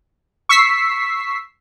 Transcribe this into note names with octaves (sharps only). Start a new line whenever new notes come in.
C#6 E6 B6 C7